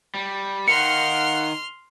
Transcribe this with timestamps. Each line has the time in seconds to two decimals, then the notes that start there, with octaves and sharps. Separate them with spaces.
0.15 G3
0.68 D#3 F5 F#5 C6 F6 C#7